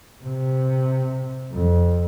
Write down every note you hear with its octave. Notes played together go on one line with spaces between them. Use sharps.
C3
F2